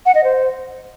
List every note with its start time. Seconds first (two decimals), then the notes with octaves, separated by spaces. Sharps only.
0.06 F#5
0.15 D#5
0.24 C5